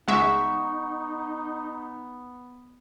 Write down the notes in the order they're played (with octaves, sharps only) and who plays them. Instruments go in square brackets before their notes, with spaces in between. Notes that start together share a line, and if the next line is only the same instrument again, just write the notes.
[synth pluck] C#2 G#3 E5 [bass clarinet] B3 [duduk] D#4 [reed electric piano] F#5 C#6